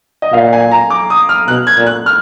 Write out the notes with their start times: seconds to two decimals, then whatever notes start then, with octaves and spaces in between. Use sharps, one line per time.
0.22 D#5
0.32 A#2 F5
0.53 G#5
0.71 A#5
0.90 D6
1.10 D#6
1.29 F6
1.48 B2 F#6
1.67 G#6
1.78 A#2
1.87 F#6
2.06 F6